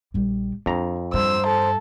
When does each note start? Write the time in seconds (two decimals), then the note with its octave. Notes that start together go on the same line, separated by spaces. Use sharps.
0.14 A#1 G3
0.66 F2 D4 A#5
1.13 G2 C5 E6
1.47 A4